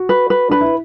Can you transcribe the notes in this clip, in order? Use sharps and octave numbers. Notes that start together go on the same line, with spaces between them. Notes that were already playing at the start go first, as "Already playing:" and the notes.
Already playing: F#4
B4
B4
D4 B4
E4